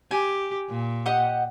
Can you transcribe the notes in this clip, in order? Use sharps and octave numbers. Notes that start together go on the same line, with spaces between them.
G4 G#5
A#2
G4 D#5 F#5